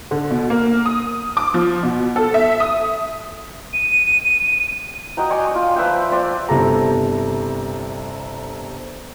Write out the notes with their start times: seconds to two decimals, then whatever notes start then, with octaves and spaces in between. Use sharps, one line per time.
0.11 D3
0.31 B2
0.50 A#3
0.86 D#6
1.37 D6
1.54 F3
1.83 B2
2.16 A4
2.34 E5
2.60 D#6
3.73 D#7
5.17 F#4 D#5 G5 A#5
5.30 D5 G5 G#5 C#6
5.51 F4 G5
5.76 F3 B4 E5 G5
6.11 C5 D5 G5
6.49 G1 C3 E4 A4 A#5